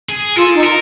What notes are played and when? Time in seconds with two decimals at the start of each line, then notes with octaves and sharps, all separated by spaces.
0.09 G#4
0.36 F4 A4
0.54 D#4
0.63 A#4